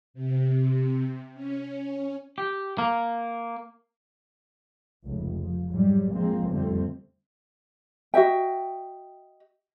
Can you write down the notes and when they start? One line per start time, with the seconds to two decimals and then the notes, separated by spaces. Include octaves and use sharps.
0.14 C3
1.34 C#4
2.38 G4
2.78 A#3
5.04 F1 C#2
5.41 F3
5.72 G#2 F#3 G3
6.13 F3 G#3 A#3 C4
6.50 F2 D3 G3 A3 C4
8.14 F#4 D#5 E5 G5